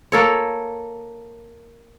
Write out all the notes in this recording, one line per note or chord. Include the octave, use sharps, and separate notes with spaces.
A#3 A4 C#5